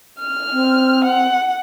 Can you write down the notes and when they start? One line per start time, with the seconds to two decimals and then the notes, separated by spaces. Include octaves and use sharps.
0.19 F6
0.52 C4
1.05 F#5